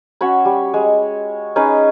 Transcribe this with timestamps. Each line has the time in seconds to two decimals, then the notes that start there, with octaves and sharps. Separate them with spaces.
0.21 C#4 F#4 C#5 B5
0.45 G3
0.74 G#3
1.56 C#4 D#4 G#4 B4